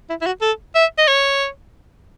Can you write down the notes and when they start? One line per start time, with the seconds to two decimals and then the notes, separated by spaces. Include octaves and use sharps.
0.10 E4
0.21 E4
0.27 F#4
0.42 A4
0.75 E5
0.98 D#5
1.08 C#5